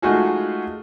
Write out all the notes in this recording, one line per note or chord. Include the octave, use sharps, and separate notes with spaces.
G#3 A3 D#4 F4 F#4 G#4